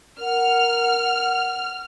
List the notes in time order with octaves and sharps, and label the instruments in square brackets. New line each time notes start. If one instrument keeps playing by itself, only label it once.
[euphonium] A#4 [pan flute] F#5 [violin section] F6